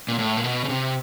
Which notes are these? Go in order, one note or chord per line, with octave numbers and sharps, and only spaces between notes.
A#2
A2
A#2
B2
C#3
C3